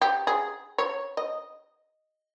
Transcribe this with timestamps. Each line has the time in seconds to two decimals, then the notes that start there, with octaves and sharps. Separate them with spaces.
0.01 G4
0.27 G#4
0.78 C#5
1.17 D#5